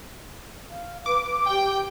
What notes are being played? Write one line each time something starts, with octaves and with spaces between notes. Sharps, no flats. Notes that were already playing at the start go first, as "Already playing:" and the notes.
F5
B4 D6
G4 G5